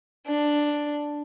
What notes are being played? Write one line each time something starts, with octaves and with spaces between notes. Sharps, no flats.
D4